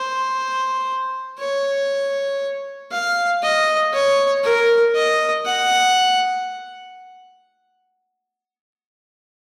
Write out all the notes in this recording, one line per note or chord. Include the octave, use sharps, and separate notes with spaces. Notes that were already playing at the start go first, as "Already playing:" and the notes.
Already playing: C5
C#5
F5
D#5
C#5
A#4
D#5
F#5